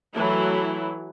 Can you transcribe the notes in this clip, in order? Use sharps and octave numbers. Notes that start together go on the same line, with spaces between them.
E3 F#3 A3 E4